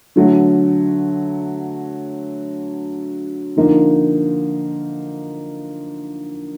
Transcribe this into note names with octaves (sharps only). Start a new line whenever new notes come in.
D3 F#3 A3
D3 F3 A#3 D#4